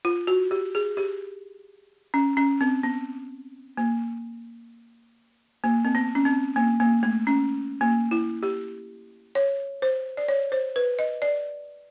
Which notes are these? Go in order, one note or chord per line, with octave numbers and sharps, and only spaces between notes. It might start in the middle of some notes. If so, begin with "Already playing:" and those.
F4
F#4
G4
G#4
G4
C#4
C#4
C4
B3
A#3
A#3
C4
B3
C#4
C4
A#3
A#3
A3
C#4
A#3
E4
G4
C#5
C5
D5
C#5
C5
B4
D#5
D5